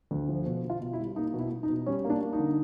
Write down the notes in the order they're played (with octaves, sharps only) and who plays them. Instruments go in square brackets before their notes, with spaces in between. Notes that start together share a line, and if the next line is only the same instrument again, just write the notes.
[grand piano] D2
F3
B2
B2
F4
B2
E4
G3
A#3 D#4
B2
E4
B2
D#4
B2
G3 C#4
A#3
D4
A#3
D#4
D3